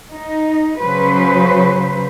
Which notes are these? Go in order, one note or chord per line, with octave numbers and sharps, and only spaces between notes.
D#4
C#3 F#3 B4 C5